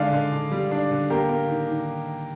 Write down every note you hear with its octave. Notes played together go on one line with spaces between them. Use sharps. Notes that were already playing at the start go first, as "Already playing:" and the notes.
Already playing: D3 D#3 G#3 D5 F5
D3
D3
G3
D4
D3
A#3 G4 A#4
A#3
D#3
D#3